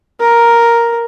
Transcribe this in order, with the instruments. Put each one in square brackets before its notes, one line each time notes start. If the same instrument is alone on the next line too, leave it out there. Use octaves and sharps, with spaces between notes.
[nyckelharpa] A#4